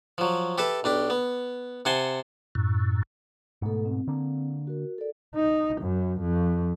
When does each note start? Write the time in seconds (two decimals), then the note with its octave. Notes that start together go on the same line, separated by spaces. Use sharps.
0.18 F3 F#3
0.58 G4 A4 B4 E5 A5
0.84 B1 D4 G4
1.10 B3
1.85 C3 F#5 G#5 A5 C6
2.55 F#2 A2
3.62 G#2 B2 A3 A4
3.85 C4
4.07 D3 A#3 D4
4.67 F#4 A#4
4.98 A4 A#4 D5
5.35 D#4
5.82 F#2
6.21 F2